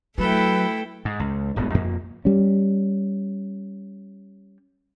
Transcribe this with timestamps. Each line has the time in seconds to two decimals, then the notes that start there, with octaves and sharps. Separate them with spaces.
0.18 F#3 A3 E4 A4 B4 G5
1.05 G#2
1.20 C#2
1.56 D1 G1 G#2 B3
1.74 F2 A#3
2.25 G3 C#4